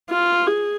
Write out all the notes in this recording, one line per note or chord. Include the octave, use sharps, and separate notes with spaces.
F4
G#4